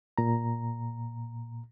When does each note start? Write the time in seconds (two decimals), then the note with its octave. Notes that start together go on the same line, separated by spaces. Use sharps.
0.18 A#2 A#5